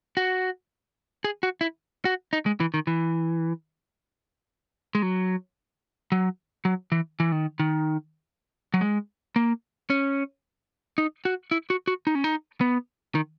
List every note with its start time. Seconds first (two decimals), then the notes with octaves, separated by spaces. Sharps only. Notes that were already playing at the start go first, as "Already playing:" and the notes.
0.17 F#4
1.24 G#4
1.43 F#4
1.61 E4
2.05 F#4
2.33 D#4
2.46 G#3
2.60 E3
2.74 D#3
2.87 E3
4.95 G#3
5.03 F#3
6.12 F#3
6.65 F#3
6.92 E3
7.20 E3
7.32 D#3
7.60 D#3
8.74 F#3
8.81 G#3
9.36 A#3
9.90 C#4
10.98 D#4
11.25 F#4
11.51 E4
11.70 F#4
11.88 F#4
12.07 D#4
12.15 C#4
12.24 D#4
12.61 B3
13.15 D#3